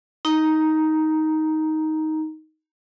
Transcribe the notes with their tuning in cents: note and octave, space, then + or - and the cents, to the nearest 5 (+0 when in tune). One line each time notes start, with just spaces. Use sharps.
D#4 +10 A#5 +0